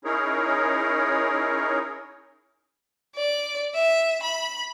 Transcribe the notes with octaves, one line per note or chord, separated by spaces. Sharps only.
C#4 D#4 E4 G#4 A#4 C#5
D5
E5
B5